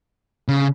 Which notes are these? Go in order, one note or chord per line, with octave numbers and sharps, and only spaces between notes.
C#3